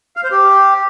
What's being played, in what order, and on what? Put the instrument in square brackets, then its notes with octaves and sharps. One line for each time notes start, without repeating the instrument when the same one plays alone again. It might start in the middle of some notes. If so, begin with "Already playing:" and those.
[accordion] F5
C5
G4